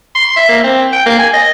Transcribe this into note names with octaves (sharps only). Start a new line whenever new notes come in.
C6
E5
A#3
C4
G5
A#3
G#5
D#5